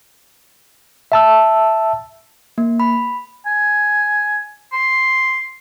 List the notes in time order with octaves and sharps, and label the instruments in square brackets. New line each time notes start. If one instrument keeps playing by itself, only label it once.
[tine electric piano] E5 A5 E6
[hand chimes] A#3
B5
[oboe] G#5
C6